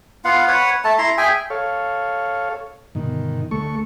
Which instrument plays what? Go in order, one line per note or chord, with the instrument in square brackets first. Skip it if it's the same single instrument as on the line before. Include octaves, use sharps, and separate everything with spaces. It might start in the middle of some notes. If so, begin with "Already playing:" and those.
[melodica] B3 F4 F5 F#5
B4 C#5 F#5
A3 A4 A5
E4 A#5 C6
G#4 E5 G5 G#5
[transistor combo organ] A4 C#5 F5
[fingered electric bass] G1 B2 [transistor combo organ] D#3
[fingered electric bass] D2 A3 [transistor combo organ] A4 C#6